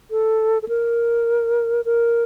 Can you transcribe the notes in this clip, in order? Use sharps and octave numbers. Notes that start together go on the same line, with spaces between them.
A4
A4
A#4
A#4